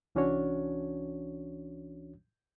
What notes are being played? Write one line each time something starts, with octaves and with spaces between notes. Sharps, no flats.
C2 E3 C#4 D4 F#4 C#5